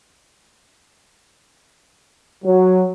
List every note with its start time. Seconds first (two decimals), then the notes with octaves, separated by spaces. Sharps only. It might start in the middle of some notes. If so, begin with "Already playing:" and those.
2.44 F#3